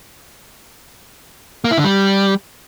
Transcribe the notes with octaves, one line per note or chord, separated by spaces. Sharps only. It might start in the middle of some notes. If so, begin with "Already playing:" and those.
A#3
E4
D3
G3